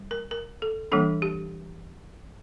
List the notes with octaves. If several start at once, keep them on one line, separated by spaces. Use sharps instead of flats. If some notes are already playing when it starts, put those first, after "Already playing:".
Already playing: G3
A#4
A#4
A4
E3 G3 A#3 D4 A4
G4